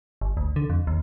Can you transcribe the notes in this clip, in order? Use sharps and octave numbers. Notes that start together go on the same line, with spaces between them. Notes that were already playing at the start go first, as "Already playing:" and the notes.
G1
D2
D3
F2
D#2